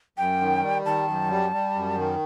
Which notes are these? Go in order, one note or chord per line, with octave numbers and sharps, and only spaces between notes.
F#2 G5
D#3
G3
D#3 A5
F#2
G3
G3
F#2
D#3